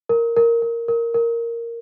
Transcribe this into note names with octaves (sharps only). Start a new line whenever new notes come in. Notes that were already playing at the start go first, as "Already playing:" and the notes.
A#4
A#4
A#4
A#4
A#4